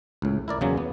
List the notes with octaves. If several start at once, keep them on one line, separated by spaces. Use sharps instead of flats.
C#2 A2
E4 A#4 D5
E2 C#3 F#3 A#3
B3